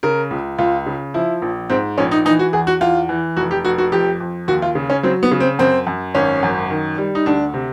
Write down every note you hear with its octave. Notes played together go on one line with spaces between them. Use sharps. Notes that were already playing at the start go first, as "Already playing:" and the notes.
C#3 A#4
C#2
C#2 F4
C#3
F3 E4
A#1
G#2 C4
A#1 C#4
D#4
E3 D#4
F#4
E2 G#4
F#4
E2 F4
E3
F1 F#4
G4
F1 F#4
F#4
F2 G4
F2
D#2 F#4
F4
C#3
C#4
F#3 C4
B3
C#3
C4
F#2 C4
F#2
G#1 C#4
F#2
D#3
G3
D#4
D2 D4
C3